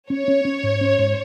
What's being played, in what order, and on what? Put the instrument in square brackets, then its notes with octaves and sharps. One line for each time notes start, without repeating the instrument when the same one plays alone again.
[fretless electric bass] C#4 [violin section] C#5
[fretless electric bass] C#4
C#4
G#2
C#4
G#2